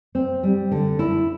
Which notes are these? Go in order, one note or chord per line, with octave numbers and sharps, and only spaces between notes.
C4
G3
D3
E4